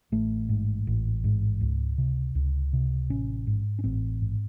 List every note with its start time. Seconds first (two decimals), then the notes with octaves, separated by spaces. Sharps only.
0.12 A1 A3
0.49 G#2
0.87 A1
1.24 G#2
1.61 C#2
1.98 C3
2.35 C#2
2.73 C3
3.10 A1 C#4
3.47 G#2
3.79 C#4
3.84 A1 C4
4.22 G#2